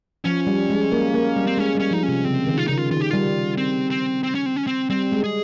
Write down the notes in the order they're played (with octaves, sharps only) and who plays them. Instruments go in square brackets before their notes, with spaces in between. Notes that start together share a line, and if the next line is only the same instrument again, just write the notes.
[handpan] F3 [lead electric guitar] C#4
[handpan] G3
G#3
A#3
A#3
G3
[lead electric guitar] C4
[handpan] G#3 [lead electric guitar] C#4
[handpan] G3 [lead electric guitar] C#4
[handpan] F3 [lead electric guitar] D#4
[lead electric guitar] C#4
[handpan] C3
[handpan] C#3 [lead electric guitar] C4
[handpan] D#3
[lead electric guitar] F4
[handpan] C#3 [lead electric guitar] D#4
[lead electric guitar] F4
[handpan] D#3 [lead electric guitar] F4
[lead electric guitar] G4
[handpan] G3 [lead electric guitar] F4
[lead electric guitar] C4
C4
C4
C#4
C4
C#4
C4
[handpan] G3 [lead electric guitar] C4
[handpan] G#3
[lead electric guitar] G#4